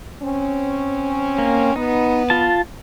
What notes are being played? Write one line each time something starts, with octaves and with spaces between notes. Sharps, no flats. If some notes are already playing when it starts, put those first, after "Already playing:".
C4 C#4
A#3
B3 D#4
F4 A5